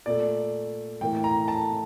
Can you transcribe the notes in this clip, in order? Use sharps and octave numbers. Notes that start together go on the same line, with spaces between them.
A#2 A3 D5
A2 E3 A#3 G5
A#5
A5